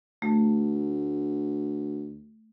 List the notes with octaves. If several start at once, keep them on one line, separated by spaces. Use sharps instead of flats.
D2 A3